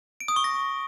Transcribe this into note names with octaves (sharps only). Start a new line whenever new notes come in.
D7
D#6
C#6
A#6